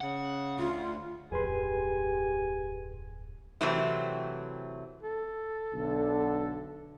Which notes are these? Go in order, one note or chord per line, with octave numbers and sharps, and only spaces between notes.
C#3 F#5
D2 F4
D1 F2 G4 G#4 B4 G#5 C6
C3 E3 F#3 A3 C4 E4
A4
B1 D3